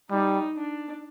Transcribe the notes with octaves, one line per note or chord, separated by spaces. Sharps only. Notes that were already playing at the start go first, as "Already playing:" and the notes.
G3 D#4
D4